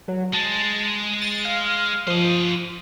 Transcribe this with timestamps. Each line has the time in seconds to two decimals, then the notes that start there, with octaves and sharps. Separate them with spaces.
0.08 F#3
0.34 G#3 A5
1.21 A6
1.45 F5
2.07 F3 C5 D#5